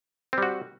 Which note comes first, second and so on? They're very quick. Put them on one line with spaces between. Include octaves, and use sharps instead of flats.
C4 G3 F#4